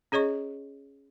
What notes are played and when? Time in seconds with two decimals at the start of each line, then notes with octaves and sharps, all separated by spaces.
0.12 C#4 G#4 C#5 D#5 C#6